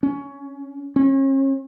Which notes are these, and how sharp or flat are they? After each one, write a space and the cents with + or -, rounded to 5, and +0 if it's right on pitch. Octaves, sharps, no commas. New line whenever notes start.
C#4 +15
C#4 -40